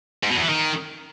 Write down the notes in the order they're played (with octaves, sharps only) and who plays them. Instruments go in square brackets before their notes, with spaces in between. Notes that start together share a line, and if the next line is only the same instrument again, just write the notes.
[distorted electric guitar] G#2
B2
E2
E3
D#3